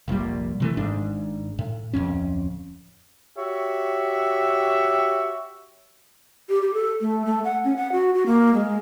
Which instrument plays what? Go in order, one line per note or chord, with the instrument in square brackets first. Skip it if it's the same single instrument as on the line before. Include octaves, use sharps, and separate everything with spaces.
[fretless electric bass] F1 A#1 A#2 G3
C3 E3 A3
G#1 G#2 D4
A2
D1 G1 F2 C#4
[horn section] F#4 G4 C#5 E5
[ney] G4
G4
A4
A3
A3
F#5
C#4
F#5
F#4
F#4
A#3
G#3